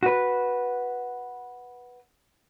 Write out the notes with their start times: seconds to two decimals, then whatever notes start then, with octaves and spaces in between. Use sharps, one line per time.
0.03 F#4 B4